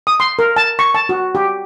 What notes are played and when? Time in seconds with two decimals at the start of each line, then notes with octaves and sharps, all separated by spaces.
0.07 D#6
0.20 C6
0.39 A#4
0.56 A5
0.79 C#6
0.95 A5
1.09 F#4
1.35 G4